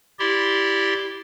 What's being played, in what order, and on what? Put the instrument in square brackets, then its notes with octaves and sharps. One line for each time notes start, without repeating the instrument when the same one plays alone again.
[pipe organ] E4 G4 D5 C6